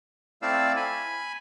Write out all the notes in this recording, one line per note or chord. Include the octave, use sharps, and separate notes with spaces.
A3 C4 E4 D5 F5 E6
G#5 B5